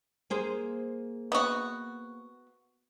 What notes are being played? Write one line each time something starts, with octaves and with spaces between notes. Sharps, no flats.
A#3 G#4 C5
B3 F#4